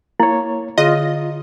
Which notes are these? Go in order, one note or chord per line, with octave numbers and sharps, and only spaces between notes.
A#3 E4 C#5
D3 F4 G#4 D#5